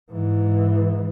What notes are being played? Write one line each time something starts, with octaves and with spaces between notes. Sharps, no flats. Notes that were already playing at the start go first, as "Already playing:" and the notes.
G#2 E3